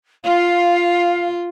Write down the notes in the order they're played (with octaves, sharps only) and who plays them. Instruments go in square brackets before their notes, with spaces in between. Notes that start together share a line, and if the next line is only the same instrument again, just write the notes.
[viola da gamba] F4 [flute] F5